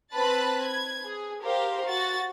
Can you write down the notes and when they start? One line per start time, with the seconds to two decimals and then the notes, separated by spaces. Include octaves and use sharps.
0.13 C4 B4 A5 B5 F#6 A6
0.61 G#6
1.05 G#4
1.43 G4 A#4 C5 F5
1.85 F#4 A6